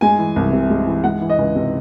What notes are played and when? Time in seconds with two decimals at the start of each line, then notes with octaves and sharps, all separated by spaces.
0.01 G#3 G#5
0.19 E3
0.36 C2
0.53 C3
0.70 G#3
0.87 E3
1.04 G#3 F#5
1.21 E3
1.30 D#5
1.38 C#2
1.55 C3